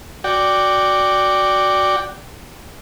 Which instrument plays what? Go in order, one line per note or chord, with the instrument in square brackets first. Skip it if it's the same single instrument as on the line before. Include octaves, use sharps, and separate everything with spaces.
[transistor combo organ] F#4 D5 G5